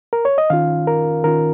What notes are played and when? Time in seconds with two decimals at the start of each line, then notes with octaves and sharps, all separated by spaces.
0.13 A#4
0.25 C#5
0.38 D#5
0.50 D#3 C#4 F4 F5
0.87 A#4
1.24 D#3 C#4 F4 A#4